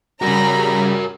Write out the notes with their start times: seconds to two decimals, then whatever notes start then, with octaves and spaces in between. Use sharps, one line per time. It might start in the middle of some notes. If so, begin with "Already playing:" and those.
0.22 C#3 G3 F#4 A#4 A#5 B5